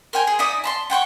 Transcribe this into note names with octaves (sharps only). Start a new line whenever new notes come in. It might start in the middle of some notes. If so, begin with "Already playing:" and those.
A#4 C5 G5 G#5
G#4
D#4 E4 D5 D#6
A5 B5 C6
F#5 G5 C6 C#6